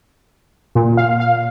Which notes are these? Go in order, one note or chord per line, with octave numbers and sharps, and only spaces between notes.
A#2
F5
F5